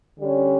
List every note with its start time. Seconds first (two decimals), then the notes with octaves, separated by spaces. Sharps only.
0.19 D3 G3 C#4